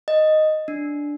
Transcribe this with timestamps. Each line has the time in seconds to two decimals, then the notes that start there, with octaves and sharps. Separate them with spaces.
0.08 D#5
0.68 D4